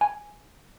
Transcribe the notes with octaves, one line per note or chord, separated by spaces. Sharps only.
G#5